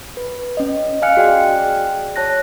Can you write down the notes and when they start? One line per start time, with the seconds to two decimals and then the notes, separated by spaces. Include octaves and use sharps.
0.17 B4
0.57 C#4 D#5
1.02 D#5 F5 G#5 F6 F#6 C#7
1.17 F#4 G#4 D5 G5 F#6
2.16 C#5 A5 F#6 A#6